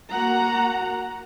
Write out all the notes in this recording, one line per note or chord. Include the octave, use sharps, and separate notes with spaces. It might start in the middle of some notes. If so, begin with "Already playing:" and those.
A#3 F#4 F#5 A#5